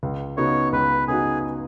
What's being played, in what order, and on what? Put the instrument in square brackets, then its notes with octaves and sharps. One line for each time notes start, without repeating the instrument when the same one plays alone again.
[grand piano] C#2
[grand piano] C#3 B3 D#4 F#4 [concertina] C#5
[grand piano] C#2 [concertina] B4
[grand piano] C#3 B3 D#4 F#4 [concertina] G#4